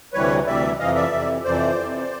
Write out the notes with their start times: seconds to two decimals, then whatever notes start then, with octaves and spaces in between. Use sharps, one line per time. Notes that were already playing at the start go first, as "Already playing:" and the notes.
0.13 D2 C3 E3 G3 B4 C#5
0.46 D2 C3 E3 G3 D5 E5
0.79 F2 C3 E3 D#5 F5
0.95 D5 E5
1.12 F2 C3 E3
1.44 F2 C3 E3 C5 D5
1.77 F2 C3 E3